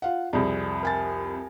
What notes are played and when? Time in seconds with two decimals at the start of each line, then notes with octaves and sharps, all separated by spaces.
0.02 F4 F5 F#5
0.33 C2 F2 G#4 D5
0.83 A#4 G#5 A6